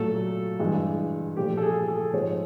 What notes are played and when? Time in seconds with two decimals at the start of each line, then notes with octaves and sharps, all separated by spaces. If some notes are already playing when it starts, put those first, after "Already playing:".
Already playing: A#2 F#3 A3 A4
0.59 G2 E3 G#3
1.37 A#2 F3 A3 G4
1.57 A4
1.62 G#4
1.88 A4
2.13 G#2 F3 G#3 C#5